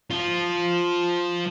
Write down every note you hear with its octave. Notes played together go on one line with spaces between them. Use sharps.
F3 F4